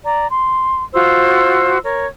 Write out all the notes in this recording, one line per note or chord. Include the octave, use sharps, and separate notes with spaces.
D5 A#5
C6
F4 F#4 C5 E6
A#4 C#5